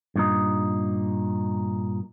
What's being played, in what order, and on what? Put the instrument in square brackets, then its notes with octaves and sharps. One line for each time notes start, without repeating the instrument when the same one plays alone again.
[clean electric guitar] G2 A#2 D#4